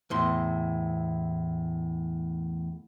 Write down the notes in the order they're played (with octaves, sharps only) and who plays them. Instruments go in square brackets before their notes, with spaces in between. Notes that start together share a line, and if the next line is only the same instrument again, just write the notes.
[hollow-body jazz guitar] E2 A2 C6